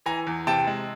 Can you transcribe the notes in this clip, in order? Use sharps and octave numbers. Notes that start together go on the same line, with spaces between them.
E3 G#5 A#5
E2
C3 G5 A5
G#3